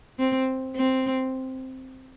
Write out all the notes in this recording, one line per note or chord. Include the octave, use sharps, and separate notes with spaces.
C4
C4